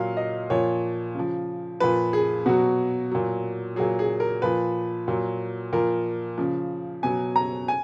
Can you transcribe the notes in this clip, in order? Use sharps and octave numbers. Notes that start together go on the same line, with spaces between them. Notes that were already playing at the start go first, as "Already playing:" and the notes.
Already playing: A#2 F#3 F5
D#5
A#2 F3 C#5
C#3 F3
A#2 F3 B4
G#4
B2 F#3 F#4
A#2 F#3
A#2 F#3 G#4
G#4
A#4
A#2 F3 B4
A#2 F#3
A#2 F3 A#4
C#3 F3
B2 F#3 G#5
A#5
G#5